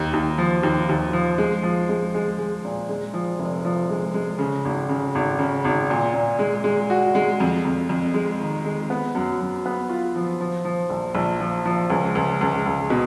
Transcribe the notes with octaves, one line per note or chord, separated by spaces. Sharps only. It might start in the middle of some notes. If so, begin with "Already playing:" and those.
Already playing: D#2
D#2
F3
D#2
D#2
F3
G#3
F3
G#3
G#3
G#3
A#2
G#3
F3
F1
F3
G#3
G#3
C#3
G#1
C#3
G#1
C#3
G#1
A#2
A#2
G#3
G#3
F#4
G#3
F2
F2
F2
G#3
D#3
G#3
B3
F#2
F#2
B3
F4
F3
F3
F3
A#1
A#1
F3
F3
C#2
C#2
C#2
C#2
B2